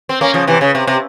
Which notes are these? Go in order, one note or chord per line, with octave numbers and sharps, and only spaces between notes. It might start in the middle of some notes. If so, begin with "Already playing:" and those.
C4
A#3 C#4
C#3 F3
C3 E3
C#3
C3
C3